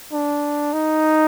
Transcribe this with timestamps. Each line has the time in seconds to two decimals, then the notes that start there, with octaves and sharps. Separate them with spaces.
0.12 D4
0.73 D#4